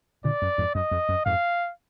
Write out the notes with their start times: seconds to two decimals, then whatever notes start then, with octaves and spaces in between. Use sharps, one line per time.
0.24 A#2 D3 D5
0.42 F#2
0.58 F2 G#2
0.75 F#2 D#5
0.91 F2
1.09 F#2
1.26 F2 G#2 F5